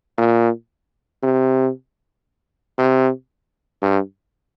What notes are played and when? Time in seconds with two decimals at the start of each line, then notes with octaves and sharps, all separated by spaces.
0.18 A#2
1.23 C3
2.78 C3
3.82 G2